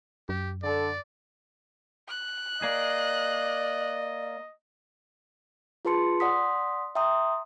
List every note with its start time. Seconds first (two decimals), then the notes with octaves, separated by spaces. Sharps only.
0.29 F#2 G4
0.63 D3 A4 D5
2.08 F#6
2.62 A#3 G#4 D5 D#5
5.85 F4 G#4 B4 A5 C6 C#7
6.20 D5 F#5 C6 D#6 B6
6.95 E5 G5 A#5 C6 D#6